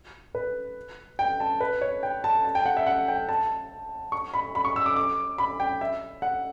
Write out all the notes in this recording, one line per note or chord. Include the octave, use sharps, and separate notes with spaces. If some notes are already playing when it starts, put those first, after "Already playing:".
B4
G5
A5
B4
C#5
G5
A5
A5
G5
F#5
E5
F#5
G5
A5
C#6
B5
B5
C#6
E6
D6
D6
B5
G5
E5
F#5